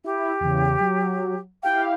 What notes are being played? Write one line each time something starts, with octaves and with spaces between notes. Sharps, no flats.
E4 G4
E2 C#3
F#3
E4 G4 F5 G5